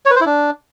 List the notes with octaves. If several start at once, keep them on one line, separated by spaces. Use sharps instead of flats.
C#5
B4
C5
E4
D4